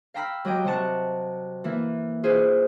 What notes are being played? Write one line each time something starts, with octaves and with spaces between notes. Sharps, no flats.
F5 G5 A#5 B5 E6 F6
F#3 G4 D#5 G5
C3 F#3 F#5 A5 C#6
E3 A#3 E4
E4 F4 G#4 B4 C5